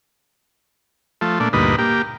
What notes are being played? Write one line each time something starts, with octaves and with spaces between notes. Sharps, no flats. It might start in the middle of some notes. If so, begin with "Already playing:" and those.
F3 A3
A#2 A3 D4
D2 G2 A#2 D#4 B4
A#3 G4